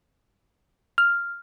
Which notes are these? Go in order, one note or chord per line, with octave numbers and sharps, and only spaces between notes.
F6